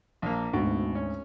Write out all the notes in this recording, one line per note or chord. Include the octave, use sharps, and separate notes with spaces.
A#1 A#3
G#1 D2 B2
C#4